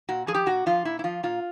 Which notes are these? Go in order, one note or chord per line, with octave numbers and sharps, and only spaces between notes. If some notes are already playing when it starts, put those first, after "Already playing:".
A#2 F#4
F3 G#4
G4
A#2 F#4
F3 F4
A#2 E4
E4
F3 F4
A#2 F4